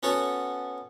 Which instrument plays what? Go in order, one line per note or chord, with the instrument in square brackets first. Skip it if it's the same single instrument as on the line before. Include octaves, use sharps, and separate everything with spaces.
[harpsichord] B3 C#4 F#4 A4 C#5